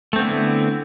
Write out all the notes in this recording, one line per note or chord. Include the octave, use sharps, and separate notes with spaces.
D3 A3 B3 C4 E4